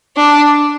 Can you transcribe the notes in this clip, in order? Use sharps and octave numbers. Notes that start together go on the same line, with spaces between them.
D4